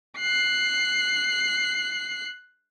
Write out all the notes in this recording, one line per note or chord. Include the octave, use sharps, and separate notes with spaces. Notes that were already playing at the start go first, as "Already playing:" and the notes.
F#6 C7